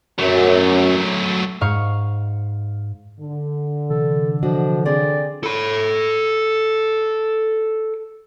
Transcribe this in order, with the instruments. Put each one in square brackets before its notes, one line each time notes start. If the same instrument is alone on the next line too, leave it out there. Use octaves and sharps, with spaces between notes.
[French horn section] F#2 [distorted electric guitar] F#3 A3
[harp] G#2 F5 C#6
[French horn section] D3
[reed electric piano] C3 E3 [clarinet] A4
[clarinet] F3 [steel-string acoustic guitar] D4 F#4 D#5
[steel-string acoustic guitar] C4 G#4 [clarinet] D5
[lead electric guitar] A4 B5